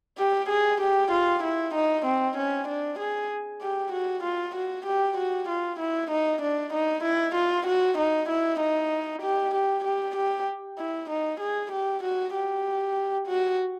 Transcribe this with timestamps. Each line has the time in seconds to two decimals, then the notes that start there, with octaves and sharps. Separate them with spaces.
0.18 G4
0.49 G#4
0.81 G4
1.11 F4
1.43 E4
1.74 D#4
2.05 C4
2.37 C#4
2.68 D4
2.99 G#4
3.61 G4
3.92 F#4
4.23 F4
4.55 F#4
4.85 G4
5.17 F#4
5.48 F4
5.79 E4
6.11 D#4
6.42 D4
6.73 D#4
7.03 E4
7.35 F4
7.67 F#4
7.98 D#4
8.29 E4
8.60 D#4
9.22 G4
9.54 G4
9.84 G4
10.16 G4
10.78 E4
11.10 D#4
11.40 G#4
11.71 G4
12.03 F#4
12.34 G4
13.27 F#4